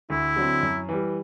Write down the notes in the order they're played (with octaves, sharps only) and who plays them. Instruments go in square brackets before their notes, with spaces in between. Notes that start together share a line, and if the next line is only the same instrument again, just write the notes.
[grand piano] D2 [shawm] E4
[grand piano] D3 F#3 C4
F#2
E3 G3